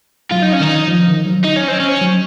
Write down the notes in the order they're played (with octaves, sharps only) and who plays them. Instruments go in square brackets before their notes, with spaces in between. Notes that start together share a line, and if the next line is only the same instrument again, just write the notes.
[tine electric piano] F#3 [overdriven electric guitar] F4
[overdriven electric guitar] D#4
C#4
[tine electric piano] D#3 [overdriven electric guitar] D#4
[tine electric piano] F3
D#3
F#3
[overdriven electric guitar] D#4
C#4
C4
C#4
[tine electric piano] F#3